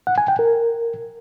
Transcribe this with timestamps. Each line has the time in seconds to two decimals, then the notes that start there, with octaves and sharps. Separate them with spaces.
0.07 F#5
0.18 G#5
0.28 G5
0.39 A#4